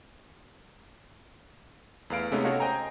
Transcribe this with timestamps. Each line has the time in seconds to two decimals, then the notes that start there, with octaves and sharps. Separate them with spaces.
2.10 E2 A3 B4 F5 D7
2.32 C3 G#3 A3 B3 C#4 D#4
2.45 F#4 A4 C#5 D#5 F5 F#5
2.60 C5 D#5 G5 G#5 A#5